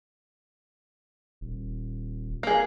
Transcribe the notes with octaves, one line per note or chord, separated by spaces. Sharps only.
D#1
A#3 G#4